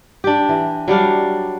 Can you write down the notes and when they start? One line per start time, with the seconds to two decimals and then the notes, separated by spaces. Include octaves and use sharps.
0.24 D4 G4
0.49 E3
0.88 F#3 G3 D4 F5